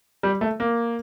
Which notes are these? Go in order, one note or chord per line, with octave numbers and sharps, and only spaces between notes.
G3
A3
A#3